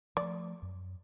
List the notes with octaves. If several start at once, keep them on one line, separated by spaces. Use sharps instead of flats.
F3 A3 D5
F#2